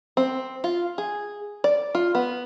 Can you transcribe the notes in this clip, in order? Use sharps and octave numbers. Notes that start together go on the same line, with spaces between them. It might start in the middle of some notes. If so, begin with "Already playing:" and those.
C4
F4
G#4
D5
F4
B3